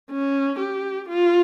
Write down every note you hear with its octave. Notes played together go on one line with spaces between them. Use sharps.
C#4
G4
F4